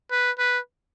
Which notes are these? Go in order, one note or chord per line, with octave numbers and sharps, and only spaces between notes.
B4
B4